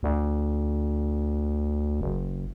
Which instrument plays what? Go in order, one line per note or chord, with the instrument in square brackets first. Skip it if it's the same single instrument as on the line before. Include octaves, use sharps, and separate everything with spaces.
[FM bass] D2
F#1